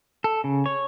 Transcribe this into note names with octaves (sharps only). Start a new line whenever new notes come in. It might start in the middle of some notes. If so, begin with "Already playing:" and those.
A4
C#3
C#5